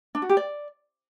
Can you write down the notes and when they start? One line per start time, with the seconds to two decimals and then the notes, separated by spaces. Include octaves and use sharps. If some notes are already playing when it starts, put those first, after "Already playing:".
0.15 D4
0.22 F#4
0.29 G4
0.37 D5